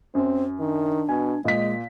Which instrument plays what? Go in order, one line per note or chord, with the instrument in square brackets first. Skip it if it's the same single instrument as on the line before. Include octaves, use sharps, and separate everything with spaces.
[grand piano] F#2 [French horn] C4
[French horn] D#3 [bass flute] D4
[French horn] B2 [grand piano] G#5
[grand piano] A#2 B6 [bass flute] G#3 [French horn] D#5